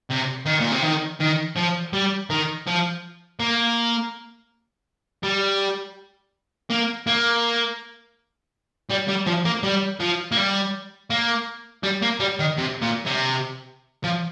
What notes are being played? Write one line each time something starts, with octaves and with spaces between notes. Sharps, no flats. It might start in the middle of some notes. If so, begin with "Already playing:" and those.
C3
D#3
A#2
C3
D#3
D#3
F3
G3
D#3
F3
A#3
G3
A#3
A#3
G3
G3
F3
A#3
G3
F3
A#3
G3
A#3
G3
A#3
G3
D#3
C3
A#2
C3
F3